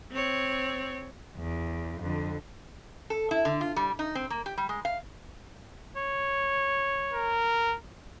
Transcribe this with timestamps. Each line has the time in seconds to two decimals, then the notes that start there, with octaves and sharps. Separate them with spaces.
0.11 C4 C#5
1.38 E2
2.01 F2 D3
3.10 A4
3.31 E4
3.45 D3
3.61 F4
3.76 G3
3.99 D#4
4.15 C4
4.30 A#3
4.46 G4
4.57 G3
4.69 G#3
4.85 F5
5.96 C#5
7.13 A#4